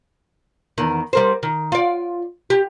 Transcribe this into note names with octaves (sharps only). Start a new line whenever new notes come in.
E2 D#3
G3 A#4 C5
D#3
F4 D5
G4